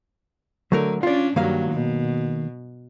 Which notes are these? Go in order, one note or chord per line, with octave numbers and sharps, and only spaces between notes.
D3 F#3 A3 A#4
C#4 D4 F4 D5
G2 D#3 F#3 A#3 F5
B2